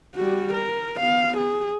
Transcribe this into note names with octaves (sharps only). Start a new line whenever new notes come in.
G3 F#4
A#4
B3 F5
G#4